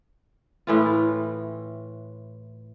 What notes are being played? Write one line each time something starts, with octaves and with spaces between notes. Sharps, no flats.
A2 E3 F4